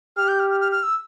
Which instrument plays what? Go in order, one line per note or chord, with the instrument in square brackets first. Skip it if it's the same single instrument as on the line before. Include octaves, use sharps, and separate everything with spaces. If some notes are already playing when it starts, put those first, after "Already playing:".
[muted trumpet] G4 [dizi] F6
[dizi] G6
F6
F6
F6
F6
E6